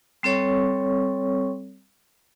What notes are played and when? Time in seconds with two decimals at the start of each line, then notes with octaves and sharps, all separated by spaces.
0.23 G3 C4 A4 C#5 C#6